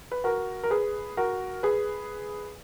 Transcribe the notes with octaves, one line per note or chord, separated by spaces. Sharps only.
B4
F#4 A#4
A#4
G#4 B4
F#4 A#4
G#4 B4